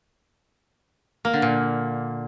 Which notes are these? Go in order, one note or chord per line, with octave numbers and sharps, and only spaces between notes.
A#3
D3
A#2